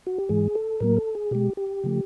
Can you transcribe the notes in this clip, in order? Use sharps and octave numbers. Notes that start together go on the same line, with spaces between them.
F#4
G4
G#2 E3 G#3 G#4
A4
A2 F#3 A#3 A#4
A4
G#4
B2 G#3 G4
G4
C#3 F3 A3